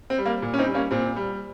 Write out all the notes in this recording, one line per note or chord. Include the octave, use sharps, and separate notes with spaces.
C4
G3
A#3
A#2
C#4
C4 D#4
G3
A#3 C#4
A#2 C4
G3